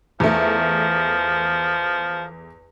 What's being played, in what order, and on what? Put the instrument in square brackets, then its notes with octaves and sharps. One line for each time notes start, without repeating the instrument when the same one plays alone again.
[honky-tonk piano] E2 A3 [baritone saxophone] F3